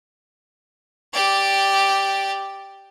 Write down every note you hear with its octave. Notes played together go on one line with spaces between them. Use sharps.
G4 D5